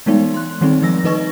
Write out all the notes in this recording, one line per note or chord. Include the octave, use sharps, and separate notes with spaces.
E3 G3 G#3 B3 D#4
C6 F#6
D#3 G3 G#3 C4 D#4
F3 A3 E6 A#6
D#3 D#4 B4 D#5 C#6 A#6